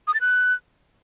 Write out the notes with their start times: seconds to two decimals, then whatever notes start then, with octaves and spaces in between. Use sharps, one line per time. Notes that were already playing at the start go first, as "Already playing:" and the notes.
0.07 D#6
0.14 A6
0.21 F#6